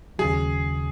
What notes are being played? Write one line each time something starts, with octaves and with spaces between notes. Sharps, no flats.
D#2 C#3 F#3 G#4